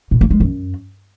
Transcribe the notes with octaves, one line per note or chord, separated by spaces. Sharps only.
A#2
A#3
G#3
F#2